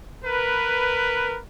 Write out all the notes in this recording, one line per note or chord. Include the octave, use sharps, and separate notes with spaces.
A#4 B4